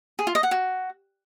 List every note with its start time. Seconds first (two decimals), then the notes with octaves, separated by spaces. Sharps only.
0.19 G#4
0.27 F4
0.35 D#5
0.43 F#5
0.51 F#4